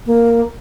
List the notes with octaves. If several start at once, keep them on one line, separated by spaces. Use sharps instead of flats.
A#3